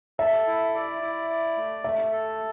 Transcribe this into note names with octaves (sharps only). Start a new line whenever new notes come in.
A4 E5
E4
D5
E4
D5
A3
A3 E5
A4